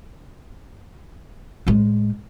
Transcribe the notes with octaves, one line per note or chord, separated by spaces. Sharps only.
A2 G#3